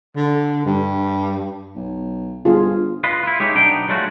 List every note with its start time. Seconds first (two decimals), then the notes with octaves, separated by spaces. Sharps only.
0.16 D3
0.66 G2
1.75 B1
2.45 G1 F4 G#4
3.04 F4 B4 D#5
3.23 E4 F4
3.40 G#3 D#4 G4 C#5 E5
3.55 B1 B3 D4 D#4 G5
3.88 F#3 G#3 A3 F4 F#4